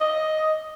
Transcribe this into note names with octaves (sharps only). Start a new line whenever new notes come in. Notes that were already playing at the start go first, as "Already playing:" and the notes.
D#5